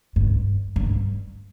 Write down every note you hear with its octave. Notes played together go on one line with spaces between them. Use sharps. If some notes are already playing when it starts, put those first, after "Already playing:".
G2
G2